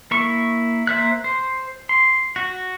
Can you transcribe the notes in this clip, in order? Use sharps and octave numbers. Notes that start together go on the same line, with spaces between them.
A#3 E4 C#6
A#3 C5 E5 F#6
C5
C6
F#4